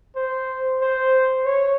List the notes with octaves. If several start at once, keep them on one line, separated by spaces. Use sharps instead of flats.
C5
C5
C#5